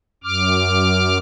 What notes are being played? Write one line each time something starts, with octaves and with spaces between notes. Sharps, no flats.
F#2 D6 F6